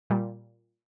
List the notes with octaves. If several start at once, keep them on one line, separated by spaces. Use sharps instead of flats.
A#2 G3